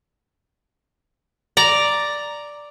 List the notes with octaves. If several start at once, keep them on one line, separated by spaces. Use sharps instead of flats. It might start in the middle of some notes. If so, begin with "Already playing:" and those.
D5 A#5